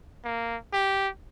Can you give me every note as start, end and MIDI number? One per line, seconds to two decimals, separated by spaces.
0.25 0.57 58
0.73 1.08 67